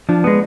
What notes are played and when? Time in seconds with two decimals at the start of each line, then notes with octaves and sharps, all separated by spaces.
0.09 F3 D4
0.24 G#3 B3